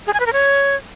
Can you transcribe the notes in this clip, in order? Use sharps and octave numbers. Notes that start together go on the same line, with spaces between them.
G#4
G#5
B4
A#4
C#5